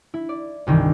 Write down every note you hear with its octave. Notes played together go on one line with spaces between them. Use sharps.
E4
D5
G1 C2 D#3 E3